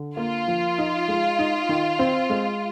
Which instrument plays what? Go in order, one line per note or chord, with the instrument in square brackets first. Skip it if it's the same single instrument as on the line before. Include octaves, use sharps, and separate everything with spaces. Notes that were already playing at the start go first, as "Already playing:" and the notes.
Already playing: [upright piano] D3
[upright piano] A#3 [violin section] F4
[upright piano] F3
D#4
G#3
D#4
D#3
C4
G#3